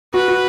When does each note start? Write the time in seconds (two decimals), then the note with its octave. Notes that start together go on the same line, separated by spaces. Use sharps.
0.14 F#4 B4
0.28 F#4